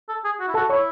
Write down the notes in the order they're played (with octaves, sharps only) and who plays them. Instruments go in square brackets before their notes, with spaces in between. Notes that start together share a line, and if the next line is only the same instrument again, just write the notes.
[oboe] A4
G#4
F#4
E4
[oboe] F#4 [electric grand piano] A4 A5
[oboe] E4 [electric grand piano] C#5 C#6